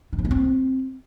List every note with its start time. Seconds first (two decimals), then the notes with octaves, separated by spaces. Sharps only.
0.13 D#3
0.19 F3
0.25 G#3
0.31 C4